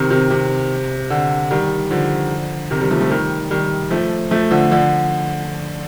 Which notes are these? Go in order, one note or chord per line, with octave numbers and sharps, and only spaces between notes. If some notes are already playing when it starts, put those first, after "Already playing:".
Already playing: C3 D#3
C3 D#3
C3
D3
D#3 G3
D3 F3
C3 D#3
D#3 G3
F3 A3
F3 A3
D#3 G3
D#3 G3
F3 A3
F3 A3
D3 F3
D3 F3